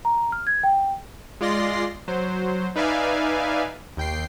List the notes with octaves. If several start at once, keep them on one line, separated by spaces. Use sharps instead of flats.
A#5
F6
G#6
G5
G#3 F4 D5 C6 A#6 C7
F#3 C5
D#4 B4 D5 E5 F5 G#5
D#2 G5 C7